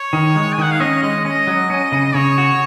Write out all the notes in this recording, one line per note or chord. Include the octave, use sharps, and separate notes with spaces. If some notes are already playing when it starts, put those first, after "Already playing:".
Already playing: C#5
D#3
G#3
G#5
D#3 F#5
F5
C#4 D#5
G#3 D#5
C#4 D#5
F#3
C#4
C#3
C#3 C#5
F#4